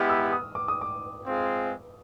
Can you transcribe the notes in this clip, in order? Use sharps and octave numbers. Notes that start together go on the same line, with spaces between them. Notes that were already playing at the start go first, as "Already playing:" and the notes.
Already playing: G#3 B3 E4 G4 F6
E6
D#6
D6
D#6
D6
G#3 C4 F4 G#4